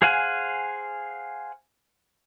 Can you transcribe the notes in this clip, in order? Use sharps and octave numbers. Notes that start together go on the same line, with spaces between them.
G#4 C5 F5 F#5 G#5